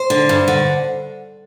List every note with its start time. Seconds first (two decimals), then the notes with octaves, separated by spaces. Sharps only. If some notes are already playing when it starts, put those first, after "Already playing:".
Already playing: C5
0.10 D3
0.29 G2
0.48 D3